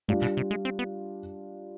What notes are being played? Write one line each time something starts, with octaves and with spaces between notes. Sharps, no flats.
G#2 G3 D4 F4
B2
C3
G#3
C4
B3